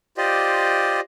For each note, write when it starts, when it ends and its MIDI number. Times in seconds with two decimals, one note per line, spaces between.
0.17 1.00 65
0.17 1.00 67
0.17 1.00 72
0.17 1.00 74
0.17 1.00 75